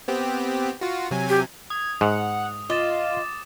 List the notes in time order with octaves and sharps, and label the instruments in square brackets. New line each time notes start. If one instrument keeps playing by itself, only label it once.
[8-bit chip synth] B3 C4 G4
F4 F#4
C3 F#3 G#5
[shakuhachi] G4
[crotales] D#6 [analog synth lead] G#6
[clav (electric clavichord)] G#2 [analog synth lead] F#5
[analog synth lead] F4 [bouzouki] D#5 [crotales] D6 A6 E7